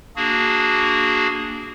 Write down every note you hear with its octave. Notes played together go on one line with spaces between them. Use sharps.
A#3 D4 F#4 G#4